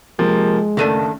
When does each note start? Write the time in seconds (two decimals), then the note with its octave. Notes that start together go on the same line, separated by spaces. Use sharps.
0.19 C3 F3 G#3 A#3
0.77 F#1 D#3 A3 D4 D#7